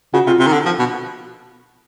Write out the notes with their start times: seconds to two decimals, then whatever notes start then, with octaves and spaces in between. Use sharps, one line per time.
0.14 C#3 F#4
0.27 C3 F4
0.39 C3
0.47 D#3
0.53 D3
0.65 F3
0.79 B2